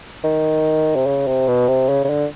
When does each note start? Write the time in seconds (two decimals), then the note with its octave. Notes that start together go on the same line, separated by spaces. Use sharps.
0.24 D#3
0.96 C3
1.06 C#3
1.27 C3
1.48 B2
1.68 C3
1.89 C#3
2.04 C#3
2.10 D3